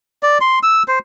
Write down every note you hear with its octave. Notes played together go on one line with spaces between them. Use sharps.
D5
C6
E6
C5